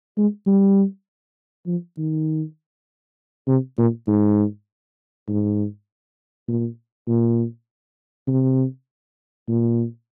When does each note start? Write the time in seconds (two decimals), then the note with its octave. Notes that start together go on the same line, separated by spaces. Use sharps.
0.17 G#3
0.47 G3
1.66 F3
1.97 D#3
3.47 C3
3.78 A#2
4.07 G#2
5.28 G#2
6.48 A#2
7.07 A#2
8.27 C3
9.48 A#2